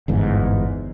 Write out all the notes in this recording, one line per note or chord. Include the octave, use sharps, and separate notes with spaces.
G1 E2 G#2